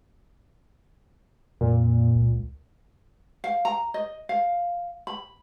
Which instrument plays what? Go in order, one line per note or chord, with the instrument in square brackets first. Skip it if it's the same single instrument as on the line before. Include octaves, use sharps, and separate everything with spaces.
[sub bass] F2 [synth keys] A#2
[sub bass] C#2
[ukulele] F5
A#5
D#5
F5
B5